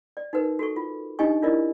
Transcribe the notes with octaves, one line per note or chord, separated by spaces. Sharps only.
D5
D#4 F#4 A#4 B4
F#4 A4 C#6
F4
D4 D#4 G4 D#5 G#5 C#6
D4 E4 F4 A#4 D5 D#5